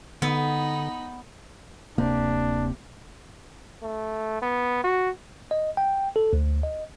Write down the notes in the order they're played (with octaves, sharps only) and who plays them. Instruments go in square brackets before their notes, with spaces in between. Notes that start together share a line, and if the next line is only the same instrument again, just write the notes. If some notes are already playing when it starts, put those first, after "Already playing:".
[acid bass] D3 [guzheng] B3 [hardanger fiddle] D#4 B5
[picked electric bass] D1 A#3 [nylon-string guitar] C3 [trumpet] D4
[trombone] A3
B3
F#4
[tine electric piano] D#5
G5
A4
D2
D#5